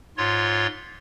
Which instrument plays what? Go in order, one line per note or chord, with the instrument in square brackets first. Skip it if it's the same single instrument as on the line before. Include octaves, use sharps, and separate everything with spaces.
[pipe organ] G#2 F4 C#5 C6